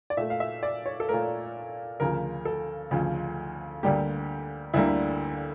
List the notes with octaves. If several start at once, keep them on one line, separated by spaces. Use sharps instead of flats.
D5
A#2 A3 E5
F5
E5
D5
C#5
A4
A#2 A3 A#4
D2 C#3 F3 A#4
A4
D2 C#3 F3
D2 D3 G3 A#3 G4
D2 D3 G3 A#3 E4